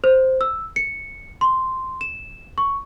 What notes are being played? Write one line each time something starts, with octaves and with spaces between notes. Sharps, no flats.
C5
E6
C#7
C6
E7
C#6